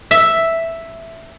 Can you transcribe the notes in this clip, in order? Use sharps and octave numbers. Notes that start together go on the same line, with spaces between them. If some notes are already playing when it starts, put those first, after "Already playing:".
E5